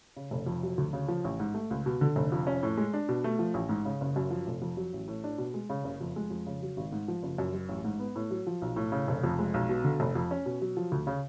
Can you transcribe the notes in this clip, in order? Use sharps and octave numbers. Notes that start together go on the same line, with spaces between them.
C#3
F1
F2
F#3
D2
C#3
F3
A1
G#2
A3
C#2
B2
D3
F1
F2
C#4
A2
G#3
D4
B2
A3
F3
A1
G#2
C#3
F#1
F#2
F3
F1
F2
F#3
A1
A2
D4
B2
G#3
C#3
F#1
F2
G#3
F2
C#3
F#3
G#1
G#2
F3
F#1
F#2
F#3
A1
G#2
B3
A2
F#3
F3
B1
A2
C#3
F1
F2
G#3
B1
B2
D3
F1
F2
C#4
B2
F#3
F3
D2
C#3